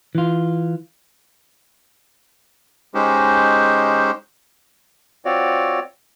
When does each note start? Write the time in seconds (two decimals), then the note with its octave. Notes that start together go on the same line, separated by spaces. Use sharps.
0.15 E3 F4
2.94 G#3 C#4 D#4 G4 C5
5.25 C4 F4 F#4 C#5 D5